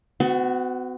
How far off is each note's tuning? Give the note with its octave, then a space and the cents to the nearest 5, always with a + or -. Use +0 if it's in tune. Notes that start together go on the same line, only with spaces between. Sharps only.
B3 +45 F#4 +0